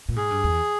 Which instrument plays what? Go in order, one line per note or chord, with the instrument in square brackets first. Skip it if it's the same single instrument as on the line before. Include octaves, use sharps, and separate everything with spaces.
[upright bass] A#2
[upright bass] G#2 [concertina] G#4
[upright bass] G2
E2